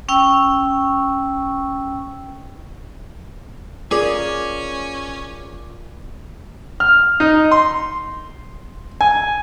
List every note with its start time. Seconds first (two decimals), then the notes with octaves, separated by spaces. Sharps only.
0.09 C#4 G5 C#6 E6
3.91 C#4 F4 G#4 A#4 D5 D6
6.80 F6
7.20 D#4
7.51 C6
9.01 G#5